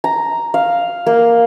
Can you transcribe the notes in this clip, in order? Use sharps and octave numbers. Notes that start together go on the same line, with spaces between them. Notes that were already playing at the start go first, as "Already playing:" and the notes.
A#5
F5
A#3